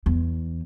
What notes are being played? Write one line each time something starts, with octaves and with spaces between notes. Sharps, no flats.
E2